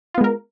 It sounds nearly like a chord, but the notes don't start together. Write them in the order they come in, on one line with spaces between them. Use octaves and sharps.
F4 B3 G#3 A#4